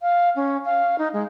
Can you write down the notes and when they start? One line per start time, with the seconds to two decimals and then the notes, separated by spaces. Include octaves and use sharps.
0.02 F5
0.36 C#4
0.65 F5
0.98 D#4
1.13 G#3